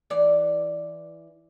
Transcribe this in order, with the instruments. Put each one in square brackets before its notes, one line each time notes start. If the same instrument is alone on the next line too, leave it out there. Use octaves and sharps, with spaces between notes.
[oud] E3 D5